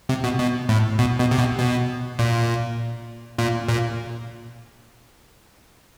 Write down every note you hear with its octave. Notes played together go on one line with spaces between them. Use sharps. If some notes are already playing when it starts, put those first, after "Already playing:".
C3
B2
B2
A2
B2
B2
C3
B2
B2
A#2
A#2
A#2